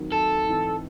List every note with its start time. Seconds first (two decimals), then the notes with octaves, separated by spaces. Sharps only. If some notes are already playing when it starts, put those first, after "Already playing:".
Already playing: D#2 D#3 F#3 C4
0.12 A4
0.47 G#2 E3 C4